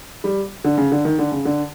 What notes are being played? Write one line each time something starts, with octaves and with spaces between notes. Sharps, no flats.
G3
D3
C#3
D3
D#3
D3
C#3
D3